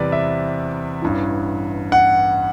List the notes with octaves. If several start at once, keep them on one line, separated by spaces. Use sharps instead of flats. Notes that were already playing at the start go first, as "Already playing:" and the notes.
Already playing: E2 C3 G3 C4 B4 D5
E5
A1 G2 E3
F#5